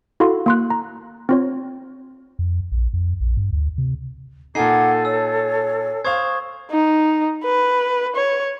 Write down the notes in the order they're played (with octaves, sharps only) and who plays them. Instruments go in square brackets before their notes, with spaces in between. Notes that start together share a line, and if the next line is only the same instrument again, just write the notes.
[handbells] E4 F#4 A4 F5 C6
A#3 C6 F#6
A#5
C4 F4 C#5
[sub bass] F2
A#1
F2
A#1
G2
D2
C3
[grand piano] A#2 D#4 [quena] A4 [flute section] F#5 D6 G#6 [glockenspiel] G#5 C7
[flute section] C#5 A5 [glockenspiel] E6
[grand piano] C5 F5 [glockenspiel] C#6 D#6 G#6
[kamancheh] D#4
B4
C#5